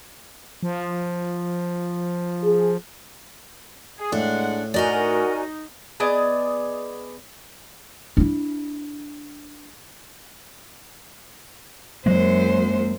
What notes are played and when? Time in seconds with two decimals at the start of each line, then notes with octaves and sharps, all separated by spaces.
0.63 F3
2.44 G#4
3.99 G#4
4.12 A2 G#3 D4 F#5
4.74 D#4 F#4 A#4 D5 D#5 G#5 A#5
6.00 B3 G#4 D5 D#5
8.17 D4 E4
12.06 F#2 F#3 G#3 A#3 C5